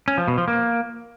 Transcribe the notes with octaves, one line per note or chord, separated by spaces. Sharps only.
C#4
F3
B2
F3
A#3